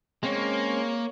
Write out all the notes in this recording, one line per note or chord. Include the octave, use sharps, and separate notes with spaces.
G#3 A#3 C4 C#4 C#5